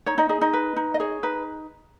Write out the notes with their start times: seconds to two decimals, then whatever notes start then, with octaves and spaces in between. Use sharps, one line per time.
0.06 D#4 C#5
0.18 D#4 D#5
0.29 D#4 G#4 D#5
0.41 D#4 D#5
0.53 B4
0.76 D#4
0.94 D#5
1.00 G#4 C#5
1.23 D#4 B4